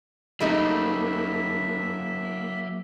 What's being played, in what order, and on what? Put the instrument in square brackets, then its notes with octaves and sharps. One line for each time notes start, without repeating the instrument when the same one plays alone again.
[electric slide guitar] F#3 A#3 [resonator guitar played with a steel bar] G3 A3 D#4 [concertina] E5